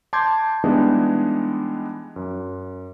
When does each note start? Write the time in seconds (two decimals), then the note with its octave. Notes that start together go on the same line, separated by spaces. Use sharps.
0.13 A5 C6 D6 G6 G#6
0.64 E3 G3 G#3 B3 D4 D#4
2.16 F#2